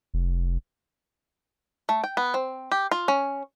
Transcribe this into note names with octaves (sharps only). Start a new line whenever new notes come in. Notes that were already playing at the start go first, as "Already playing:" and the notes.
F1
A3
G5
B3
C4
G4
F4
C#4